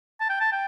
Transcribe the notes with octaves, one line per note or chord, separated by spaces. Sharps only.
A5
G5
A5
G5